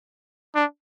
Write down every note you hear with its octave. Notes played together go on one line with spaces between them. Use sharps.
D4